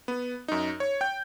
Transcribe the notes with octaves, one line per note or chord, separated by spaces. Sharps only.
B3
F#2 D#4
C#5
G5 G6